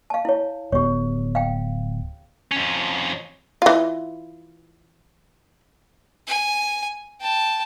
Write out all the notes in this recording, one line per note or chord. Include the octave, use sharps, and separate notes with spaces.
F5 A5
E4 C#5
D1 B3 G4 C#5
F5 G5
F2 C#4
E3 F4
G#5
G5 A5